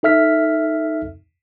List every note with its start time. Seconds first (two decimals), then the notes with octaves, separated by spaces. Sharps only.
0.03 D#4 A4 E5 F6 B6